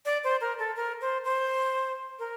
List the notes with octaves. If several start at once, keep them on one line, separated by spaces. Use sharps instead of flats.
D5
C5
A#4
A4
A#4
C5
C5
A#4